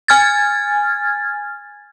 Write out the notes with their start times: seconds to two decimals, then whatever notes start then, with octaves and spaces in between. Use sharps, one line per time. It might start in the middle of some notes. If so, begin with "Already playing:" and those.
0.08 G#5 F6 G#6 A6